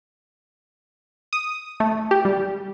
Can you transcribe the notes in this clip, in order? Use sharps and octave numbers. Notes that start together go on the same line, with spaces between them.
D#6
A3
G4
G3